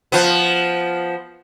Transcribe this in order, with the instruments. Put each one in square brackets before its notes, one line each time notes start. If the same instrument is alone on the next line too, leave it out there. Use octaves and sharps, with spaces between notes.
[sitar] F3 B3